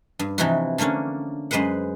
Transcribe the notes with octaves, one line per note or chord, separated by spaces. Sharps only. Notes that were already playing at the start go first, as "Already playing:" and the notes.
G2
C3 E3 F3 D#4 E4 F#4
D3 A3 A#3 C#4 D4
F#2 G#3 B4 C5 F#5